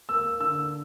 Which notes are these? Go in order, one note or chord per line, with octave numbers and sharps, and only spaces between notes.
A#3 E6
D3 E6